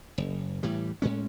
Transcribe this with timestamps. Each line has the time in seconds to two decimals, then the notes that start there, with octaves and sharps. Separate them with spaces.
0.18 F#1
0.63 A2 E3 G3
1.02 A2 G#3 C#4